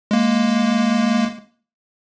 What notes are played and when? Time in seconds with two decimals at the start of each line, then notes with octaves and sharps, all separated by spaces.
0.11 G#3 A#3